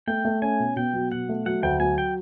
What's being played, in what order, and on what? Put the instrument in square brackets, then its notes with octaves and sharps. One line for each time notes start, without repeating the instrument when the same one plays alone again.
[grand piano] A3 [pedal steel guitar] G5
[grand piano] A3
[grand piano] C#4 [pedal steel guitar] G#5
[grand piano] B2
[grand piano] B2 [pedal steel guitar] G5
[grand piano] F#3
[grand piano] B2 [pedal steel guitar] F#5
[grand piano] A3
[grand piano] F#3 [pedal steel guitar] F#5
[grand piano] D2 [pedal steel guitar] G5
[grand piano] F#3 [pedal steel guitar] G#5
[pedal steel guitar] G5